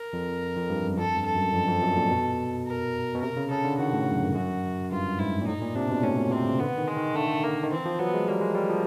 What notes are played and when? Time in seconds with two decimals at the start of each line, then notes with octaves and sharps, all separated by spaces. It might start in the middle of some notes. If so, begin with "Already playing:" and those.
Already playing: A#4
0.13 F2
0.56 F2
0.70 G2
0.83 F#2
0.98 F2 A4
1.16 G2
1.26 A4
1.36 F#2
1.54 F2
1.68 F2
1.82 F#2
1.96 A#2
2.10 B2
2.66 A#4
3.14 B2
3.22 C3 A#4
3.37 C#3
3.51 C#3 A4
3.64 D3
3.79 D#3 F#4
3.93 A2
4.11 F#2
4.21 G2
4.34 F#2 F#4
4.91 G2 F4
5.19 G#2 E4
5.41 A#2
5.47 A2 D#4
5.62 A#2
5.75 C3 D4
5.89 B2
6.03 A2 C#4
6.17 A#2
6.31 C3 C4
6.45 C#3
6.59 D3 B3
6.77 D#3
6.88 G#3
6.97 D#3
7.15 D3 A3
7.43 A#3
7.64 D#3
7.72 E3 C4
7.85 F3
7.99 F#3 B3
8.14 G#3
8.28 G3 A#3
8.41 G#3
8.55 G3
8.70 F3